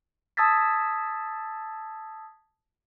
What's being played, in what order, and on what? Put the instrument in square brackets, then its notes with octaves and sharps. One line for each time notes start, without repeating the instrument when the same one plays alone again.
[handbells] A5 D#6 E6 G#6 A6 B6